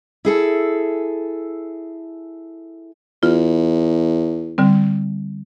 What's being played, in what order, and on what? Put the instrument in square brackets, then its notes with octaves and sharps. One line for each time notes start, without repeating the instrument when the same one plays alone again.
[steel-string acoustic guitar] E4 G#4 A4
[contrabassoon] E2 [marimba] F4
[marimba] D3 G3 C4